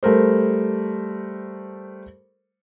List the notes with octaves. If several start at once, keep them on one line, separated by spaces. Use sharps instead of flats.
G3 A3 A4 A#4 C5